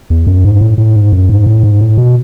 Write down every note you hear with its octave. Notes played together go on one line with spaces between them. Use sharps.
E2
F#2
G#2
A2
A2
G#2
F#2
G#2
A2
G#2
A2
B2